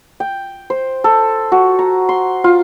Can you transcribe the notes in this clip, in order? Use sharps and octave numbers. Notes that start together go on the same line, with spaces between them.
G5
C5
A4
F#4
A#5
C6
F4